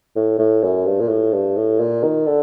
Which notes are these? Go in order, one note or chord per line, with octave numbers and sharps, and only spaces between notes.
A2
A2
F#2
G2
A#2
A2
G2
A2
A#2
D#3
D3